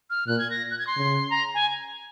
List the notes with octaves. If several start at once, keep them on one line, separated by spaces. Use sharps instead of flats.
F6
A#2 F#6
G#6
A#6
F#6
G#6
C6
C#3
A#5
G#5